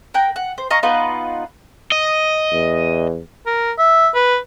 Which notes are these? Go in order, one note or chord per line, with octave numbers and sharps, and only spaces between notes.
A#4 F#5 G5
F#5
C5
D#5 F5 A#5 C#6
B3 D#4 F4 B4
D#5
E2
A#4
E5
B4